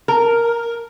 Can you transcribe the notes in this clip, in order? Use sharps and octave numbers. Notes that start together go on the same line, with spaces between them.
A#4